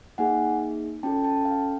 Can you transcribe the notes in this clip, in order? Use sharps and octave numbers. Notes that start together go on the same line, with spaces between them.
A#3 D#4 G#4 F#5 G#5
C#4 F4 A4 G5 A5
G5 A5
F5 G5